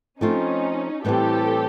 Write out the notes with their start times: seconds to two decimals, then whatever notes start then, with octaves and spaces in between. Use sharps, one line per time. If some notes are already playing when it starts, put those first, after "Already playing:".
0.21 F3 A3 C4 C#4 D#4 F4
1.05 A2 E3 G3 C4 G4 A4